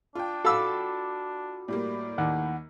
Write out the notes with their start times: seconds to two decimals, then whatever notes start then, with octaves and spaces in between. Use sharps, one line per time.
0.15 D4 F4 G5
0.45 F#4 A4 F5 B5 D6 E6
1.68 A2 G3 A#3 D5
2.18 D#2 F#5